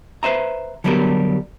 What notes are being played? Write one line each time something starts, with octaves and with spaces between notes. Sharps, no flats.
B4 C5 E5 A#5
D3 F#3 G3 B3 G4 A#4